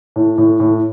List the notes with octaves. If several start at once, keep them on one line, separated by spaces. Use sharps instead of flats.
A2
A2
A2